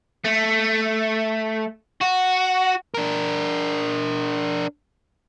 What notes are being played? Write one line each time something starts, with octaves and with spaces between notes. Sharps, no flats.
A3
F#4
D4 A#4